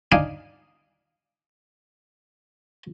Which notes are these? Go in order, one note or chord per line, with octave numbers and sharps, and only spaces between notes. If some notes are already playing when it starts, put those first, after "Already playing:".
D4 D#4 F5 G#5